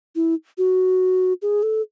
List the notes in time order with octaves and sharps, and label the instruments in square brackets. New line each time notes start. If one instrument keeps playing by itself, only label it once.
[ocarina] E4
F#4
G#4
A4